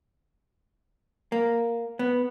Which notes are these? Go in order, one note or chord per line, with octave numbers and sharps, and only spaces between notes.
A#3
B3